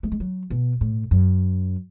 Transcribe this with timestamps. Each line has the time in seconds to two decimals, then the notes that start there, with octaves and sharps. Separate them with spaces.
0.03 A3
0.12 G#3
0.20 F#3
0.50 B2
0.81 A2
1.11 F#2